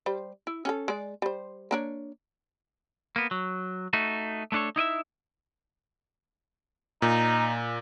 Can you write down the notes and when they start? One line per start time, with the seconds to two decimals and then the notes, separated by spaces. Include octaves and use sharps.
0.06 G3 C5
0.47 E4
0.65 C#4 G#4 A4
0.88 G#3 D5
1.22 G3 C5
1.71 A#3 D4 C#5
3.16 A#3 B3
3.31 F#3
3.93 A3 D#4 F#4
4.52 A3 B3 D4 A4 C#5
4.76 D#4 E4 D#5 E5
7.02 A#2 D#4